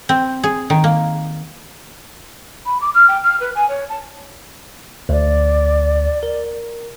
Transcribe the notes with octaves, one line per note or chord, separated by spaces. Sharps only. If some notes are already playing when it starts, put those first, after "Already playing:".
C4
G#4
D#3
A#3
B5
D6
F6
G5
F6
B4
G#5
C#5
A5
D2 D5
A#4